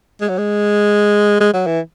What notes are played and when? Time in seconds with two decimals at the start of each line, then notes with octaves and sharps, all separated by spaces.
0.21 G#3
0.29 F#3
0.38 G#3
1.40 G#3
1.53 F#3
1.67 E3